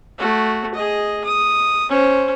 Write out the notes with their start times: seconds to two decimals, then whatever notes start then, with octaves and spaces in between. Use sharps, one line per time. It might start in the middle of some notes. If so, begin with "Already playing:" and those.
0.18 A3 F#4
0.74 G#4 D#5
1.25 D#6
1.90 C#4 C5